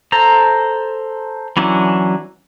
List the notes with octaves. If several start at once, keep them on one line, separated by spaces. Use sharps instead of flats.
A4 C5 A#5
E3 F#3 C#4 D4 E4